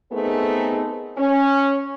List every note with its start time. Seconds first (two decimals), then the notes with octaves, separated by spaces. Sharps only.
0.12 A3 B3 C4 D#4 G#4 A#4
1.18 C#4